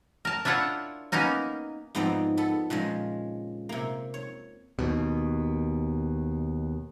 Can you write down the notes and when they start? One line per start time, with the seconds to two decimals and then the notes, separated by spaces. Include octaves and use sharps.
0.25 A#4 A5
0.45 D4 E4 F4 C#5 F#5
1.12 A#3 B3 C#4 D#4 A#4
1.95 F2 G#2 B3 C4 D#4 D5
2.37 B3 A4
2.70 A#2 C#3 F3 G#3
3.69 C3 A#3
4.14 C#5
4.79 D#2 B2